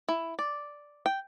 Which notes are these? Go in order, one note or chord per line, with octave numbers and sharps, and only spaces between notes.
E4
D5
G5